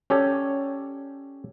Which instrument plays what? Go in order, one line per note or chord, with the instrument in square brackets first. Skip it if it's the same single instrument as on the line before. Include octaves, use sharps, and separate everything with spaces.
[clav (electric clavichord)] C#4 G4 A4 C#5 D5